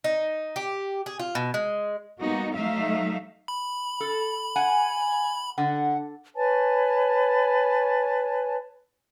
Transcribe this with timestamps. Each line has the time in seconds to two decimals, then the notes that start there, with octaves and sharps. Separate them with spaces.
0.04 D#4
0.56 G4
1.06 G#4
1.19 F4
1.35 B2
1.54 G#3
2.21 G3 A#3 B3 D#4 F#4
2.55 F#3 A3 D#4 E5 F5
3.48 B5
4.00 A4
4.56 F#5 G#5
5.58 D3 F#5
6.36 B4 C#5 G#5 A5